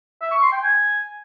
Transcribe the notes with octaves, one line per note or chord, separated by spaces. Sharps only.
E5
C#6
C6
G5
G#5